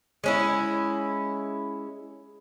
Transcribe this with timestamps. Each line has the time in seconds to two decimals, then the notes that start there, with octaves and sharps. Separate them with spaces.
0.24 G#3 C#4 E4